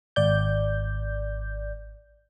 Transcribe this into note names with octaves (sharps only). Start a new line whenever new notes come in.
G#1 D5 G6